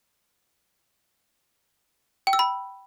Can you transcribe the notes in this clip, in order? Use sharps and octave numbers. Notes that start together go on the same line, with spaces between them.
G5
E6
B5